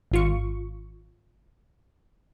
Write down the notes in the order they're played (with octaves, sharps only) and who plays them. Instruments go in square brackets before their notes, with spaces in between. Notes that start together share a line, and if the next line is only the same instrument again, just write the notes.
[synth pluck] G#1 F4 C#6